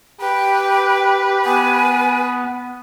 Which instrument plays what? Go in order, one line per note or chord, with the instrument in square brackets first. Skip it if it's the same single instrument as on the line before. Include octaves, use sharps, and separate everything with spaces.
[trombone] G4 [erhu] B4 [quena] G5
[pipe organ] B3 [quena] G#5